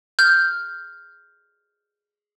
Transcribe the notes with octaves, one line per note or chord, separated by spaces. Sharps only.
F6 G6